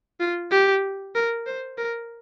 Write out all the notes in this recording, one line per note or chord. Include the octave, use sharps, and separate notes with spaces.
F4
G4
A#4
C5
A#4